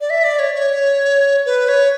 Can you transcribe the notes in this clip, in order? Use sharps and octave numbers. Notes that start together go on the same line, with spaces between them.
D5
E5
D5
C#5
C#5
B4
C#5